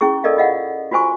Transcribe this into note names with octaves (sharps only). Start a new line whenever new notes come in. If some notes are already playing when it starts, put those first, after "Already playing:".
C#4 E4 G#4 C#6
A4 A#4 D5 D#5 F5
F4 D#5 F5 F#5
F4 F#4 C5 G#5 C#6